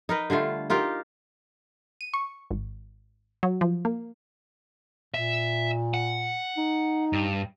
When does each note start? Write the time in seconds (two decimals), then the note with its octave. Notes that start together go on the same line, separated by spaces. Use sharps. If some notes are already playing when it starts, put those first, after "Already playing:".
0.09 D#4 A#4 B4
0.30 D3 G3 A3 F4
0.70 D#4 F4 G4 A#4
2.01 D#7
2.14 C#6
2.51 G#1
3.43 F#3
3.61 F3
3.85 A#3
5.14 A#2 E5
5.94 F#5
6.57 D#4
7.13 G2